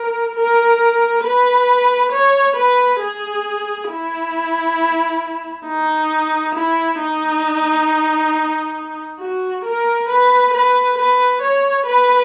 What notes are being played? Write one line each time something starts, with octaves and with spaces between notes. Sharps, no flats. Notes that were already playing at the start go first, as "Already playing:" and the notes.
Already playing: A#4
A#4
B4
C#5
B4
G#4
E4
D#4
E4
D#4
F#4
A#4
B4
B4
B4
C#5
B4